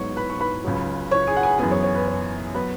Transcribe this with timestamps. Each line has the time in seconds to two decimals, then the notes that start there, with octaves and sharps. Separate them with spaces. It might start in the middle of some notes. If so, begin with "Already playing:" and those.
Already playing: G#2 F#3 B3 C#5 C#6
0.16 B4 B5
0.30 C#6
0.40 B4 B5
0.64 C#2 C#3 F#3
1.11 C#5 C#6
1.27 G#4 G#5
1.37 F#5
1.43 G#4 G#5
1.59 F#2 E3 B3 G#4 G#5
1.71 C#5
1.83 C#5
1.95 B4
2.07 C#5
2.54 F#3 B3 B4 B5